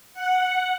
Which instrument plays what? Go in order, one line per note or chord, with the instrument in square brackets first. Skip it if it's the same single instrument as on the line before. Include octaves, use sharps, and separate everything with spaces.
[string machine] F#5